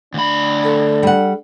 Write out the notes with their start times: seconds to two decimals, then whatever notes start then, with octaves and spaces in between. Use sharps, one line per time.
0.14 D2 D4 B5
0.64 A4
1.03 G3 F#5